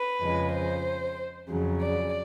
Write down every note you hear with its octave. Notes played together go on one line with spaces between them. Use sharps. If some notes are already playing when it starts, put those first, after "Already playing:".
Already playing: B4
F2 C#3 F3 G#3
C5
F2 C#3 F#3
D5